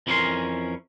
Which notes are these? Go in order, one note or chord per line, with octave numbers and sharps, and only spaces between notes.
F2 E3 C#4 E4 A#4 C6